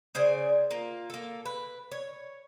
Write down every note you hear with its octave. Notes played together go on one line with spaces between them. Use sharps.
C#3 C5 D5 G#5
A#3 F4
A#3 A4
B4
C#5